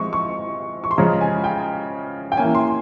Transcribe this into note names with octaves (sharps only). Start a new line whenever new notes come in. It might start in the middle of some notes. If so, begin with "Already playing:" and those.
Already playing: F3 G#3 C4 C#6
C#6
C#6
C6
C#3 F3 G#3 C#4 A#5
G#5
G5
G5
E3 A#3 C#4 G#5
C6